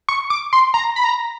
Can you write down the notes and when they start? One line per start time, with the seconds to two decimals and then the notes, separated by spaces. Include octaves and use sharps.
0.09 C#6
0.30 D6
0.53 C6
0.74 A#5
0.96 B5
1.04 A#5